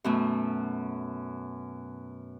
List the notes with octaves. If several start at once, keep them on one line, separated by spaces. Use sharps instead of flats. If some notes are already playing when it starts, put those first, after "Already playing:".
F#2 B2 A3